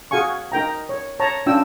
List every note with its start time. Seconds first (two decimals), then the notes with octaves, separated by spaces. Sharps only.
0.11 F#4 G#4 F5 G#5 C#6
0.52 D#4 A#4 G5 A#5
0.89 C#5
1.20 C#5 A5 A#5
1.46 C#4 D4 F4 G5 E6